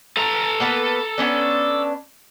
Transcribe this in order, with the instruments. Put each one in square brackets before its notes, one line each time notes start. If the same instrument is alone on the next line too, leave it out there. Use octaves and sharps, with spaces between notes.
[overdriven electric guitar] A4 A#5
[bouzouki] A#3 B3 B4
B3 C#4 D4